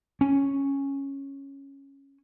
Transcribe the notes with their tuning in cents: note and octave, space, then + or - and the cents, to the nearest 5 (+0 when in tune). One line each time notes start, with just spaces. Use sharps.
C#4 -5